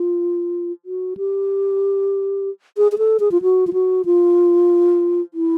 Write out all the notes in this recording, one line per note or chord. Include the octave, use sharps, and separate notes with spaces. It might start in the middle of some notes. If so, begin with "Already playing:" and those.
Already playing: F4
F#4
G4
G#4
G#4
A4
G#4
F4
F#4
F4
F#4
F4
E4